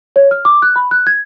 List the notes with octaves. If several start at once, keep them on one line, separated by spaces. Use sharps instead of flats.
C#5
F6
D6
F#6
B5
F#6
G#6